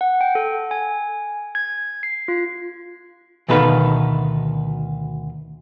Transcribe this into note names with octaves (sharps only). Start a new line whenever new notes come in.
F#5
G5
A4
G#5
G#6
C7
F4
D2 B2 D#3 A4 B4 F5